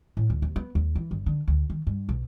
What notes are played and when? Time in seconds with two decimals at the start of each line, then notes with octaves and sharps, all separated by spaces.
0.17 A2
0.30 D2
0.42 D#2
0.56 B3
0.75 D#2
0.95 E3
1.11 G1
1.26 D3
1.48 D2
1.70 D#3
1.87 G2
2.09 B1